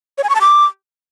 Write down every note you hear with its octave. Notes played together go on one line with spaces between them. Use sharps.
C#5
G#5
C#6
A5
D6